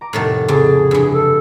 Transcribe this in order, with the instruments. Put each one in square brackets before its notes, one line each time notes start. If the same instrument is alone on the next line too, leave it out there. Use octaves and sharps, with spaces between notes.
[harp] A#5 D6
[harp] F1 A6 [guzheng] A2 D#3 A3
[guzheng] F2 [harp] C#3 A4 A5 [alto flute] G#4
[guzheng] G2 E3
[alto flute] A4